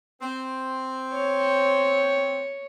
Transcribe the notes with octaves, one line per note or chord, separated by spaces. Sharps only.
C4
C#5